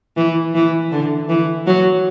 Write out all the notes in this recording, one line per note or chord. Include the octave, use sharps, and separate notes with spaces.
E3
E3
D3
E3
F#3